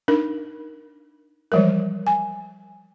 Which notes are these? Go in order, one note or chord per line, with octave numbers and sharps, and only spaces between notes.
D4 D#4 A#4
E3 F3 G3 G#3 A#4
G#5